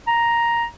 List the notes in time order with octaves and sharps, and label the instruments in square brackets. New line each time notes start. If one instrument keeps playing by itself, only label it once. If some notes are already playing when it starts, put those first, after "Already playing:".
[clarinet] A#5